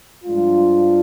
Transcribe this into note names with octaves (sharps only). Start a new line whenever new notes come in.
G2 F3 G#3 D4 F4